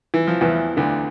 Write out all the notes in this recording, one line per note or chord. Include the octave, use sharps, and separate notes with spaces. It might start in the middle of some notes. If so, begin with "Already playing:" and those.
E3
F3
E2 E3
D2 D3